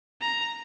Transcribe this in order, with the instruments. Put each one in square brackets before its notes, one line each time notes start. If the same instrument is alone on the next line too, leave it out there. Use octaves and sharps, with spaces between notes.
[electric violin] A#5